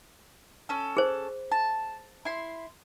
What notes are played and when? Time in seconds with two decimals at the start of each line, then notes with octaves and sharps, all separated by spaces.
0.69 C#4 A4
0.97 G#4 C5
1.52 A5
2.25 E4 C6